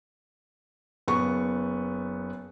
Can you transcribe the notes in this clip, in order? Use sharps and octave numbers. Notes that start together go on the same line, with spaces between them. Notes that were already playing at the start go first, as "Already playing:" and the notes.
F#1 B3 C#6